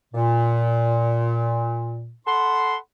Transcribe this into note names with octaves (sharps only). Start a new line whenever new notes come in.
A#2
A4 F#5 B5 C6